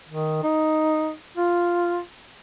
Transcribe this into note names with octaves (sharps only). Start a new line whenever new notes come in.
D#3
D#4
F4